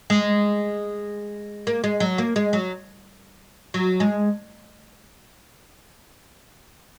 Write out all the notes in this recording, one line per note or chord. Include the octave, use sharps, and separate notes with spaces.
G#3
A#3
G#3
F#3
A#3
G#3
F#3
F#3
G#3